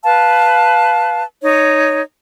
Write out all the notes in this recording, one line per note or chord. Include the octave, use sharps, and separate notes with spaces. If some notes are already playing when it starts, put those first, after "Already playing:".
B4 F5 A5
D#4 C#5